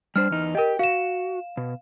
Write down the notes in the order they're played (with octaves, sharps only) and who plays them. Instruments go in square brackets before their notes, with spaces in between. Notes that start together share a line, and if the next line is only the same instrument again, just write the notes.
[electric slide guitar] G3 D4 C5 [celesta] F6
[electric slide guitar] E2 D#4
[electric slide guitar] G4 G5 [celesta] A#4 D#5
[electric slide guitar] F#4 [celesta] F5 E7
[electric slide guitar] B2